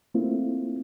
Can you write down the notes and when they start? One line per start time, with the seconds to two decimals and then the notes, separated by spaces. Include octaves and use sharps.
0.14 A3 A#3 C4 E4 F4